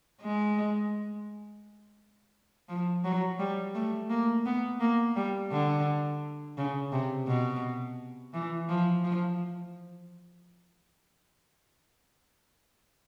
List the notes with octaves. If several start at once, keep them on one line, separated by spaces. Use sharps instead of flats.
G#3
F3
F#3
G3
A3
A#3
B3
A#3
G3
D3
C#3
C3
B2
E3
F3
F3